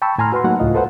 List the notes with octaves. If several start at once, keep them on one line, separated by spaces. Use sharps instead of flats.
G5 A5 B5 C#6 E6
A2 G#5 A#5 C6 F6
F#4 B4 F#5 C6
F#3 A3 A#3 D#4 F#4 F#5
C#2 A2 F4 D#5
A4 B4 C5 F#5